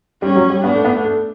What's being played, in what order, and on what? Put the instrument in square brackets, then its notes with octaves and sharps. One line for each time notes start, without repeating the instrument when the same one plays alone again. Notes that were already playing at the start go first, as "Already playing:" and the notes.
[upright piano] G3 [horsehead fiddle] C#4
[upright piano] F#3
G3
[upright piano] B3 [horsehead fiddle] D4
[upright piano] A3
B3
A3
A3